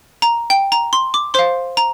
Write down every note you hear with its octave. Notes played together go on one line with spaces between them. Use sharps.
A#5
G5
A#5
C6
D6
C5 F5 C6
A#5